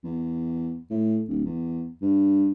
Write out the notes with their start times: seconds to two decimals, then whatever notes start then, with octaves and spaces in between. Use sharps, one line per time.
0.04 E2
0.90 A2
1.28 D1
1.46 E2
2.02 G2